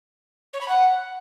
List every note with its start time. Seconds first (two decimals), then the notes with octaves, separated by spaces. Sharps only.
0.53 C#5
0.61 B5
0.68 F#5